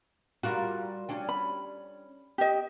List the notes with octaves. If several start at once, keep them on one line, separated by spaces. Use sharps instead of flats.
G3 F4 F#4 A#4
C#4 D4 G4
B5
G4 D#5